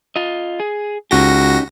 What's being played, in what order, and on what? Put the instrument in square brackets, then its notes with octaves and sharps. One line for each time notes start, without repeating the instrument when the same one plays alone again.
[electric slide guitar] F4 D#5
G#4
[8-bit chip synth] C#2 F#4 A#6 [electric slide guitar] C#4 D#4 G4